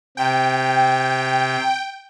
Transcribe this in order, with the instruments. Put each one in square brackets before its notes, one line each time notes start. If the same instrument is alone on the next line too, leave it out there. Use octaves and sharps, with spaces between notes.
[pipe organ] C3 [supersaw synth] G5